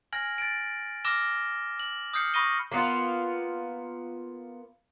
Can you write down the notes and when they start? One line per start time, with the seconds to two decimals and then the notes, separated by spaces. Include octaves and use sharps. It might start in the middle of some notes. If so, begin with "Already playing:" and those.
0.13 G#5 F6 G#6 A#6 F#7
0.38 A6 D7
1.05 D6 E6 F6 A#6 E7 G7
1.79 F#7
2.13 D#6 F6 G6 C7 C#7
2.34 B5 C#6 D#6 A#6 D#7 G7
2.72 A#3 B3 F4